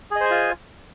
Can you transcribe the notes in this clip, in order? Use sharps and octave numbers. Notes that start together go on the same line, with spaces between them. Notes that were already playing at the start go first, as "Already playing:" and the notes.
F4 G#4 C5 D#5 G#5